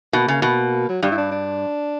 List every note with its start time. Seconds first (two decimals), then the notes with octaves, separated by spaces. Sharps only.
0.13 B2 A#3
0.28 C#3
0.42 B2
0.89 F#3
1.02 G2 G3
1.12 E4
1.17 D4
1.31 D4